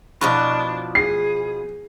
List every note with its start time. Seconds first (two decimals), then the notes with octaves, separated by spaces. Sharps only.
0.21 B2 F3 D4 E4 B4 B5 C#6
0.95 G#4 C7